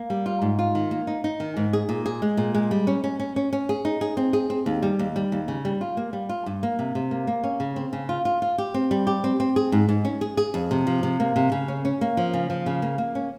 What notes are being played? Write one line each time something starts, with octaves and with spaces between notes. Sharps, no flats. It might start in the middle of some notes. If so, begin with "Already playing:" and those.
Already playing: A#3
G3
F4
G#2
F4
D#3
A#3
D#4
D#4
D#3
G#2
G#4
A#2
G#4
G#3
A#2
G#3
G3
C#4
C#4
C#4
C#4
C#4
G#4
D#4
G#4
C4
G#4
C4
D#2
G3
D#2
G3
D#2
C#3
G3
F4
A#3
G3
F4
G2
A#3
C3
C3
A#3
A#3
C#4
C#3
C4
C#3
F4
F4
F4
G4
C4
G3
G4
C4
C4
G#4
G#2
G#2
C#4
G#4
G#4
F2
C3
F3
C3
A#3
C3
C#3
C#4
C#4
A#3
F3
C#3
F3
C#3
A#3
A#3
C#4